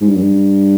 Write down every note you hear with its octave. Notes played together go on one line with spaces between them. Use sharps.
G#2
G2
F#2
G2